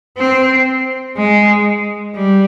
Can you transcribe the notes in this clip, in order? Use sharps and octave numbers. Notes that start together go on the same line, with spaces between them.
C4
G#3
G3